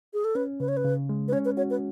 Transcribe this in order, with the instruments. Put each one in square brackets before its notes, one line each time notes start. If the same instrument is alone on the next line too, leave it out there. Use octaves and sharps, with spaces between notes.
[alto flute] G#4
A4
[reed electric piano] C#4 [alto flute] B4
[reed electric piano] C#3 [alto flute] B4
[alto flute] C#5
B4
[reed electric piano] C#3
G#3
[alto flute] B4
[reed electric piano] C#4 [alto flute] C#5
[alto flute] B4
[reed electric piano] F#4 [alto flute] C#5
[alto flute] B4